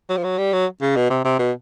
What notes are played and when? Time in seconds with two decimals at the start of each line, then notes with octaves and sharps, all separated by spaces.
0.09 F#3
0.17 F3
0.24 F#3
0.38 G3
0.53 F#3
0.82 C#3
0.96 B2
1.10 C3
1.25 C3
1.39 B2